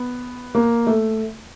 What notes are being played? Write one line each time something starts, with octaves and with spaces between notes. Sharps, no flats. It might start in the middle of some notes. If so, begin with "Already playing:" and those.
Already playing: B3
A#3
A3